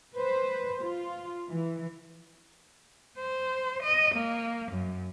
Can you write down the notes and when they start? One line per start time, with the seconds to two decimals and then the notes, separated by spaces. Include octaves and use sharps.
0.16 B4 C5
0.82 F4
1.49 E3
3.19 C5
3.83 D#5
4.15 A#3
4.71 F#2